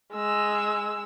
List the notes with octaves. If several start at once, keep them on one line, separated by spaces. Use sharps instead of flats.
G#3 E6